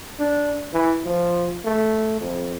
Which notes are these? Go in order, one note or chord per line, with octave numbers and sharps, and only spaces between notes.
D4
E3
F3
A3
F2